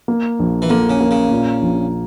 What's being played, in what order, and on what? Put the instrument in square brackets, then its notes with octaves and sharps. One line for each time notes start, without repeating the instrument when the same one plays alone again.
[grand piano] A#3
A#1
[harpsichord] E3
[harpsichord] D3 [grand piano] A#3
[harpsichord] C#3
[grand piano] A#3
[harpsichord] C#3
[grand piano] A#2
A#1